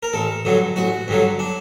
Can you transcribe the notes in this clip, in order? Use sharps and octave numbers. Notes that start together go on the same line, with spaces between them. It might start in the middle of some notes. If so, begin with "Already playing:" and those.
A#4
A1 A4
G2 D3 F#3
A1 F#4
G2 D3 F#3
D4